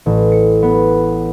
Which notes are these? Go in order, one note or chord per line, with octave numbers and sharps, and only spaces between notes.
A1
C#7
B3